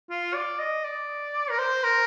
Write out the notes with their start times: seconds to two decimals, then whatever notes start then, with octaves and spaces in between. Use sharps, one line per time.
0.10 F4
0.34 D5
0.59 D#5
0.84 D5
1.50 A#4
1.58 C5
1.84 A#4